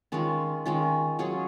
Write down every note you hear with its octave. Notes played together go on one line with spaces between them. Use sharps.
D#3 G#3 C#4 F4
D#3 G#3 C#4 F4
F#3 C#4 F4 G#4